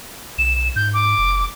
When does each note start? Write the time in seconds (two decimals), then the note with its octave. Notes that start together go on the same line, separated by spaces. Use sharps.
0.38 B1 E7
0.76 G#2 G6
0.93 D6
1.18 F#1